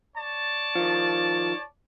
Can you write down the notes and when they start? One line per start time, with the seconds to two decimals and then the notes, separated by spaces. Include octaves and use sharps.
0.17 C#5 D5 A5
0.75 D#3 F3